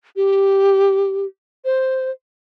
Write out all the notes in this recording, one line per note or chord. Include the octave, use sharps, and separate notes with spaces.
G4
C5